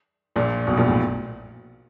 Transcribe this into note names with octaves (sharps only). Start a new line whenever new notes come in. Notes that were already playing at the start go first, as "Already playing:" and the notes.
A#1 A#2
B1 B2
A#1 A#2
A2